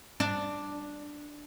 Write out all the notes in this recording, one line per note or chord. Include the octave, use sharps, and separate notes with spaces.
D4